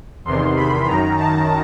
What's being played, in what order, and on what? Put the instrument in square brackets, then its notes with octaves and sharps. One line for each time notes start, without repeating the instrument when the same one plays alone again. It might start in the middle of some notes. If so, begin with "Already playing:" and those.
[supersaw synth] E2 C3 D#3 C6
B5
F#2 D#3 A#5
A5